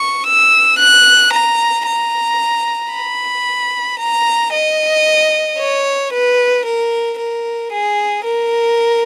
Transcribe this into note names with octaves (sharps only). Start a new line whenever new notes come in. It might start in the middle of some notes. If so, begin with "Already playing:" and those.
Already playing: C#6
E6
F#6
A#5
A#5
B5
A#5
D#5
C#5
B4
A#4
A#4
G#4
A#4